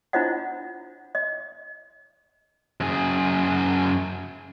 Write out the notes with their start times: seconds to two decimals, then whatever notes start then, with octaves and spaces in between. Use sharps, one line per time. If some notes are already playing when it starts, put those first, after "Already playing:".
0.13 D4 E4 F4 C5 D#5 F#5
1.15 D#5
2.81 F#2 G#4